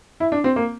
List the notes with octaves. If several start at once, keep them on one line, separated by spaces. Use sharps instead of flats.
E4
D4
C4
A#3